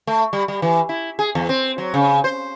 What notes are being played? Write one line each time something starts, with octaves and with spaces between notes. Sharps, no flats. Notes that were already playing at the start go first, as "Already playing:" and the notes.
A3
G3
G3
E3
E4
G#4
E2
C4
F#3
C#3
C5